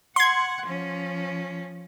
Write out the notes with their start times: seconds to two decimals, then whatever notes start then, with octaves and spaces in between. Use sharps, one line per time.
0.16 F#5 C6 G#6
0.64 F3 C#4